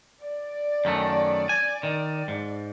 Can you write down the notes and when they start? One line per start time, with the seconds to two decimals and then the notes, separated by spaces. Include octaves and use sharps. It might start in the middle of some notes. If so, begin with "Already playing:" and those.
0.22 D5
0.85 F#2 D#3 A3
1.49 G#5
1.83 D#3
2.28 G#2